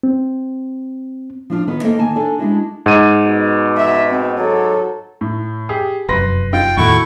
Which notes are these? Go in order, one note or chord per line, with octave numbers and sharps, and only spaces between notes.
C4
F3 D4 F4
D#3 B3 D#4 B4
A#3 A4 C5 D#5 F5 G5
D2 D#3 A#3 G#5 A5
D4 A4 D5 G#5
G#3 D4 E4 F#4
G#2 D#7
B2
E5
C4
F#3 A4
A2
G4 G#4
F1 F#2 B4 C6 A#6
F4 G5
E2 A2 D#3 A3 E4 F#4 C#6